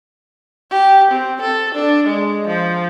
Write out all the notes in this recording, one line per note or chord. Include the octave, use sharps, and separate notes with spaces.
G4
C4
A4
D4
G#3
F3